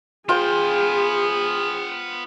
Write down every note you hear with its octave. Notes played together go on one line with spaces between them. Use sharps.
B3 F4 G#4 C5 G5